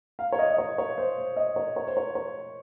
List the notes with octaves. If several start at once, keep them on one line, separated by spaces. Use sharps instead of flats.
F5
C#5
D#5
D#5
C#5
C#5
C5
C5
D#5
C#5
C#5
C5
C#5
C#5